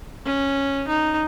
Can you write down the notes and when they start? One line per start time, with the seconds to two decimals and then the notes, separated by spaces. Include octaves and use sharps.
0.26 C#4
0.88 D#4